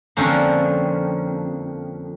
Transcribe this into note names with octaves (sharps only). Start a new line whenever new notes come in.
F2 D3 F3 A#3 C#4